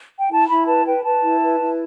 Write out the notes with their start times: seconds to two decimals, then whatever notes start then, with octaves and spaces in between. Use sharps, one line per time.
0.19 G5
0.30 E4 A5
0.49 E4 B5
0.67 B4 A5
0.85 B4 G5
1.04 B4 A5
1.22 E4
1.41 B4
1.59 E4